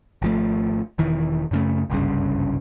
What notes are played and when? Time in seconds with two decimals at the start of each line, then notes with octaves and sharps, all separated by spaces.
0.22 G#1 F3 A3
0.98 E1 D#3 E3
1.51 F#2 C#3 A3
1.90 F#1 C2 G2 C#3